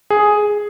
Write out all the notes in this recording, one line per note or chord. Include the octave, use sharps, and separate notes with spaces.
G#4